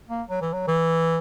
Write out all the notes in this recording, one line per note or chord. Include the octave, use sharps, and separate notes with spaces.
A#3
F#3
E3
F#3
E3